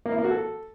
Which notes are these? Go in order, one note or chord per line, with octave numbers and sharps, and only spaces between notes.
A#3
E4
A#3
F#4
A4